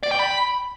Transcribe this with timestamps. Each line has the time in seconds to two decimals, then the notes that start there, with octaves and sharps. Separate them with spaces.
0.03 D5
0.11 G5
0.19 B5